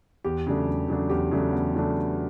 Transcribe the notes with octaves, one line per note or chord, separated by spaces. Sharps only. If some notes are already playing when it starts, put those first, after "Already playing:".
E2 G4
C#3 F#3 A3 D4
E2
C#3 F#3 A3 D4
E2 G4
C#3 F#3 A3 D4
E2
C#3 F#3 A3 D4